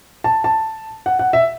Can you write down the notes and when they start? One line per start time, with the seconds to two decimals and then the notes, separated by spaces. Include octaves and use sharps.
0.24 A5
0.44 A5
1.06 F#5
1.19 F#5
1.33 E5